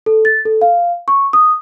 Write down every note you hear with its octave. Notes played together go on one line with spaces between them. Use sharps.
A4
A6
A4
F5
C#6
D#6